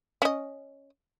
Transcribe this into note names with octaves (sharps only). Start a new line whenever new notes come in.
C#4 D#5